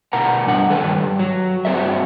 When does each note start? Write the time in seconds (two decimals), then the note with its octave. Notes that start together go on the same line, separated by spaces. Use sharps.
0.13 B2 A#4 F#5 A#5
0.46 G2 G3 D4 F#5
0.68 G2 D#3 A4 B4
1.00 G2
1.19 F#3
1.65 G2 C4 F#4 A4 D5 E5